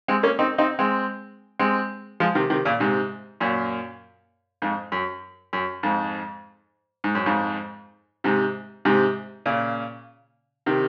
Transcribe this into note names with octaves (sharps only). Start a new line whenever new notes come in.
G#3 C4
A#3 C#4
C4 D#4
C4 D#4
G#3 C4
G#3 C4
F3 G#3
C3 D#3
C3 D#3
A#2 C#3
G#2 C3
F#2 A#2
F2 G#2
F#2
F#2
F2 G#2
G#2
F#2
F2 G#2
G#2 C3
G#2 C3
A#2 C#3
C3 D#3